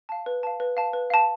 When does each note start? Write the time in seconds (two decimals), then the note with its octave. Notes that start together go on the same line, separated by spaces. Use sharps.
0.09 F5 A5
0.26 B4
0.43 F5 A5
0.60 B4
0.77 F5 A5
0.93 B4
1.10 F5 A5